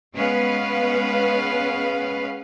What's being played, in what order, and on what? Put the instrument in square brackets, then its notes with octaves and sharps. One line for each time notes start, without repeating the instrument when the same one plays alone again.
[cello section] G#3 B3 C#4 B4 F5